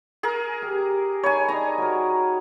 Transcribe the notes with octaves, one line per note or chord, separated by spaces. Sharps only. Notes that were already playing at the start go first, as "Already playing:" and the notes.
G#4 A#4
G4
D#4 C#5 G#5 B5
D4 D#4 D#5 A#5
F#4 A#4